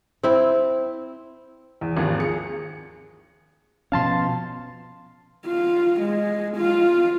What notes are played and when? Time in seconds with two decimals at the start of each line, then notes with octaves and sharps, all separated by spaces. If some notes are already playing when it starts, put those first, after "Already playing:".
0.23 C4 E4
1.81 E2
1.97 G#1 D#2 F3
2.20 G#4 C#7
3.92 B2 F3 C#4 F5 A5 C6
5.47 F4
6.01 G#3
6.57 F4